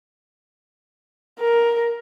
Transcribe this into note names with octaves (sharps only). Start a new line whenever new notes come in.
A#4